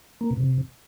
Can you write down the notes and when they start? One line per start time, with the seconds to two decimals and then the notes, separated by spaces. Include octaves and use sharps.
0.21 A#3
0.31 B2
0.40 C3